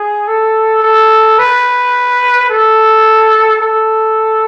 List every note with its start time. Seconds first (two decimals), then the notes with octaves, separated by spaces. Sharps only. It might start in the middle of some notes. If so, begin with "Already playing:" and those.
Already playing: G#4
0.28 A4
0.83 A4
1.39 B4
2.50 A4
3.61 A4